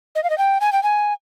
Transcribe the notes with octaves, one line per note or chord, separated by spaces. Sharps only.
D#5
F5
D#5
G5
G#5
G5
G#5